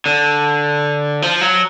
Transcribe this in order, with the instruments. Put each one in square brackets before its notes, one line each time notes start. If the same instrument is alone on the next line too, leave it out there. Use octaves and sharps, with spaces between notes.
[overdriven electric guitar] D3
F3
F#3